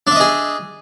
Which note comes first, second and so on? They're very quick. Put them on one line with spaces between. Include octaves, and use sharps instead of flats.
D4 E5 D#5 G#4